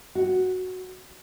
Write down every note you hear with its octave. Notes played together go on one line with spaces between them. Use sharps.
F#4